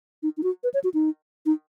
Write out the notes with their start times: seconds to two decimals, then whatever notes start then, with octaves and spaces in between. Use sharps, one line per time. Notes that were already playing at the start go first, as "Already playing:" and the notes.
0.23 D#4
0.37 D#4
0.43 F#4
0.64 B4
0.74 C#5
0.84 F#4
0.94 D#4
1.46 D#4